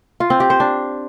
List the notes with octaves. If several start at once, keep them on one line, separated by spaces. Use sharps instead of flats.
F4
C4
G4
C5
D4